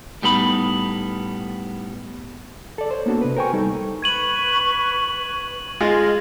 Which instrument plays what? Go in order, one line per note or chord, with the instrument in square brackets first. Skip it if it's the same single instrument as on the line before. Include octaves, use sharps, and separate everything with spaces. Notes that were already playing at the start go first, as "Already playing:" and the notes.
[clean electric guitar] A2 G3 B3 D#4 B5
[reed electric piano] A4 D5
C5 C#5
A#3 B3 D4 F#4 A4
C3 B4
A#4 C5 G5 G#5 C#6
G3 D#4 A4
[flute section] B4 C#6 [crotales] G#6 D#7 F#7
[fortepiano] G#3 F4 [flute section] D#5 F6